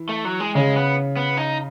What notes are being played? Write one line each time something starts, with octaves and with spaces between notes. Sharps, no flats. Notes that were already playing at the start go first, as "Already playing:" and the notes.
Already playing: E3
A3
F#3
G#3
C#3 G#3
B3
B3
D#4